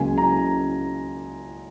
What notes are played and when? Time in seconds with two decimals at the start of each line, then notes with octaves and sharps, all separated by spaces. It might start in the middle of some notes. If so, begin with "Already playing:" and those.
Already playing: C#2 C#3 F#3 A#3 G#5
0.18 A#5